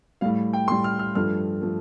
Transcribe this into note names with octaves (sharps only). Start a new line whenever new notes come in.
A2 G3 F5
G5
A2 G3 C6
F6
F6
G2 F3 A3 F6
F3 A3